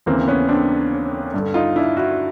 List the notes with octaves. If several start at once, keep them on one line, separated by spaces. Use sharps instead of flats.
D#2 C#3 E3 A#3 C4
B3 C#4
C4 D4
G2 D3
D#4 F4
D4 E4
E4 F#4